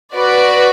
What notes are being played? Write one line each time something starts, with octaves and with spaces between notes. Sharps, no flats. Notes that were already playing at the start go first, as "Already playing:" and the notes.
F#4 B4 D5